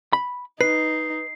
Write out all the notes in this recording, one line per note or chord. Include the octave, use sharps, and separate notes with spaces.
B5
D#4 B4 C7